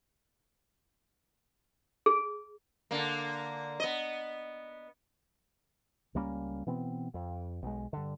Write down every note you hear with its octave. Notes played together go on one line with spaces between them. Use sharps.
G#4
D3 A#3
B3 D#5
C#2 G3 A#3 C#4
B2 E3 B3 C4
F2
B1 G#3
G2 D3